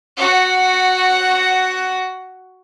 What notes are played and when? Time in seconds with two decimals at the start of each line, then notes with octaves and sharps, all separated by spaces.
0.17 F#4 F#5